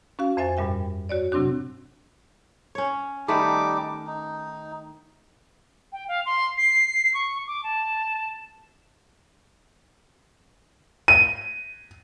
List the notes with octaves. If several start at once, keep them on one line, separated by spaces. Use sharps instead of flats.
C#4 F#4 F5
F2 C5 E5 G#5 A6
G2 A#2 G3 E5 G5
F#4 C#5 D5
C3 F#3 C4 D4 F#4
C#4 C#5
D#3 G3 A3 D#4 B4 D6
D#4
G5
F5
C6
C7
C#6
D6
A5
D#7